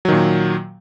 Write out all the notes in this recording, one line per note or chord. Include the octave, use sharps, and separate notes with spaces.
A#2 D#3 F#3